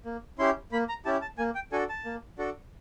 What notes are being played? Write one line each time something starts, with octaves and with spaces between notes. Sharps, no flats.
A#3
C#4 E4 G4 C6
A#3 B5
A#5
C#4 E4 G4 A5
A5
A#3 G#5
G5
D4 F#4 A4 G#5
A5
A#3
D4 F#4 A4